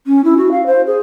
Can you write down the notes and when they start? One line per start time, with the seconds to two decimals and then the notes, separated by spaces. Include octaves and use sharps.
0.07 C#4
0.24 E4
0.37 F#4
0.51 F5
0.66 C5
0.87 G#4